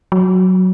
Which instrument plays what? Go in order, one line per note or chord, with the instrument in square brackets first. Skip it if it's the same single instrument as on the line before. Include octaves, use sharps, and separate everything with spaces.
[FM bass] F#3